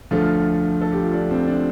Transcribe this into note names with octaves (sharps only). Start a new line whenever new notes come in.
D2 D3 F3 A3 F4
A4
G4
F4
D4
C4
D4